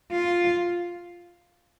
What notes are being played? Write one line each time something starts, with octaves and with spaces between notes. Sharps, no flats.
F4